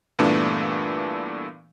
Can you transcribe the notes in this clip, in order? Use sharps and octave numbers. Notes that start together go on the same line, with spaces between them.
G2 A#2 E3 A3 B3 D4